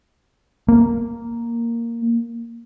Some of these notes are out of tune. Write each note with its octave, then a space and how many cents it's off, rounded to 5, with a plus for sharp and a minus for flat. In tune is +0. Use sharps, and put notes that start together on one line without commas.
A#3 -5